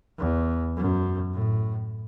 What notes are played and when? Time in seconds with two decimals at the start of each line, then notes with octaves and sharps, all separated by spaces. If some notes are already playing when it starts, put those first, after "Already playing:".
0.19 E2
0.77 F#2
1.33 A2